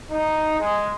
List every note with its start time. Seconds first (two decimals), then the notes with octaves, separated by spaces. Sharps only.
0.10 D#4
0.60 G#3